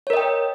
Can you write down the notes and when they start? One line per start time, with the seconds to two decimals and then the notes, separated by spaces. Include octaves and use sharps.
0.07 C#5
0.10 A#4
0.13 D#5
0.17 G5